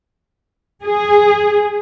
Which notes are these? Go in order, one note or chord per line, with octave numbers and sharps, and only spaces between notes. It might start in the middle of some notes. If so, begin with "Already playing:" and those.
G#4